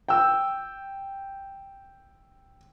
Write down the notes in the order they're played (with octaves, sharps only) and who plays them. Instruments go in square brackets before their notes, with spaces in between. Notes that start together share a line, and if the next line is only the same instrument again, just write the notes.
[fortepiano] G5 E6